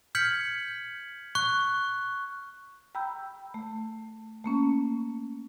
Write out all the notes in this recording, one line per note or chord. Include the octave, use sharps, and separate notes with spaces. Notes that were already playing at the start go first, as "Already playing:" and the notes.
F6 G6 G#6 B6 C#7 F#7
C#6 F#6
G5 A#5 B5 E6 G6
A3
A3 A#3 C#4